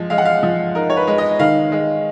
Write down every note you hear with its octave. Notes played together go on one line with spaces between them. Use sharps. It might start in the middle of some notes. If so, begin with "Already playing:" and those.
Already playing: F3 G#3
G#3 F5
F#5
F5
F3
D#4 A#4
C#5
B4
G#3
D#5
D#3 F5
G#3